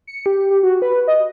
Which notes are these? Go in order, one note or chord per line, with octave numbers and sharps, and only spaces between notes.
C#7
G4
G4
F#4
B4
D#5